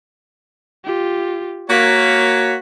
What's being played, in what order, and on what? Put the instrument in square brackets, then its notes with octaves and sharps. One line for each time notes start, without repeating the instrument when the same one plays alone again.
[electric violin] F4 G4
[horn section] A#3 F#4 C#5 [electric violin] B6